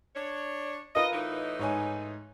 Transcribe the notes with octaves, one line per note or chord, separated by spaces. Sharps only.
D4 C#5
F4 A#4 B4 D#5
A2 E3 D#4
G#2 C#5 G#5